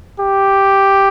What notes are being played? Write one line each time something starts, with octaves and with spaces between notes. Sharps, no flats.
G4